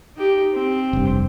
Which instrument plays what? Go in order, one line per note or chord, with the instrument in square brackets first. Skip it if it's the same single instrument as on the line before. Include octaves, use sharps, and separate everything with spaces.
[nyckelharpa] D#4 G4
C4 G4
[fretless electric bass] F1 G2